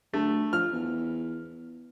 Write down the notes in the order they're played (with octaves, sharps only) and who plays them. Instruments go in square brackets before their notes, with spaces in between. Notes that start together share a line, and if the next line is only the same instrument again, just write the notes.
[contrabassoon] D2 [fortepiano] A3
[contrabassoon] F3 [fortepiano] F6
[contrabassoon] E2